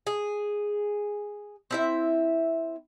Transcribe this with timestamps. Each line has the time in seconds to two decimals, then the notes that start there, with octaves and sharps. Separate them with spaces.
0.07 G#4
1.71 C4 E4 E5